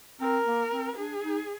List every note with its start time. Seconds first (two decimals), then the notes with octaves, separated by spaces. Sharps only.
0.21 C4 A#4
0.46 A#3
0.72 C4
0.97 D4 G#4
1.22 D#4